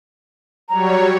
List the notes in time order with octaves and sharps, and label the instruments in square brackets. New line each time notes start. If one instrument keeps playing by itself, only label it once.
[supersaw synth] F#3 G3 C#5 [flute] A#5